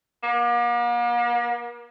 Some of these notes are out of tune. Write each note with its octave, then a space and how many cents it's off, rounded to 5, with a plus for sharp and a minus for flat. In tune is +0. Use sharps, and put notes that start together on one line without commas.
A#3 +45